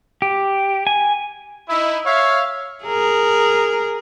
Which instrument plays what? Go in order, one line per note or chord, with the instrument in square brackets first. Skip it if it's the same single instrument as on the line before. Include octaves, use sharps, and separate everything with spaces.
[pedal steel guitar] G4
G#5
[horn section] D#4 E4 [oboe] E5
[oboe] C#5 [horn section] E5 F5
[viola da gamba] G#4 A#4